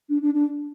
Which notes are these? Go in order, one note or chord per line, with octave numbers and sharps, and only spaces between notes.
D4
D4
D4